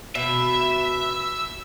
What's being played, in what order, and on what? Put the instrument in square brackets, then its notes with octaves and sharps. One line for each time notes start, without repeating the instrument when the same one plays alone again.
[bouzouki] B2 [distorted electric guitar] E5